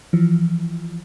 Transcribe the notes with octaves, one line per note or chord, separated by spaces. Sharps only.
E3 F3